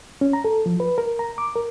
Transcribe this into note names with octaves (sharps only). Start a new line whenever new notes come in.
C#4
A#5
A4
F3
B4
A#4
A#5
D6
A#4